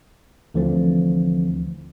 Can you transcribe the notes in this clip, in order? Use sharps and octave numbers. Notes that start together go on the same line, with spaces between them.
D2 D3 E3 F3 C4